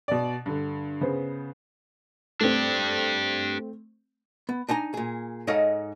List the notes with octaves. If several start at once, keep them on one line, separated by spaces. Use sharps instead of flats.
B2 D5
G2 D3
C#3 B3 C5
A3 C4 D4 G4
B3
D4 D#4 G#5 A#5
A#2 G#4
G#2 D#4 A4 C#5 D#5 F5